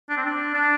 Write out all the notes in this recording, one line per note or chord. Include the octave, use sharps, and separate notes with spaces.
D4
C4
D4
D4